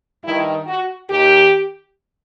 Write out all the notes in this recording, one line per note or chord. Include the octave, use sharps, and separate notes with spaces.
G2 D#3 E4
F#4
D#2 D#3 G4